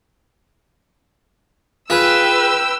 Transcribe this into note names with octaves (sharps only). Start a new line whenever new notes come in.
F4 G#4 B4 G5 E6